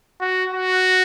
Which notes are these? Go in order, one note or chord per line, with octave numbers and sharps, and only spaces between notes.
F#4
F#4